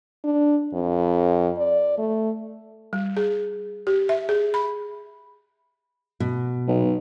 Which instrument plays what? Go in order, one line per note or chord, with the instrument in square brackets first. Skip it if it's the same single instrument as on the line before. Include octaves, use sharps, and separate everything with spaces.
[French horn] D4
F2
D5
A3
[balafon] G3
G#4
G4
E5
G#4
B5
[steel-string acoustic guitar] B2
[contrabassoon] B1